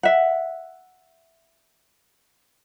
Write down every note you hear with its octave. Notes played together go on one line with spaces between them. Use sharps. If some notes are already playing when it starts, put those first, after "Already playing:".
E5 F#5